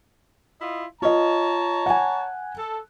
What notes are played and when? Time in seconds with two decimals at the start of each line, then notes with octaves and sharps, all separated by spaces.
0.61 E4 F4 D#5
1.02 F4 C#5 D#5 A5 A#5
1.86 F#5 G#5
2.56 A4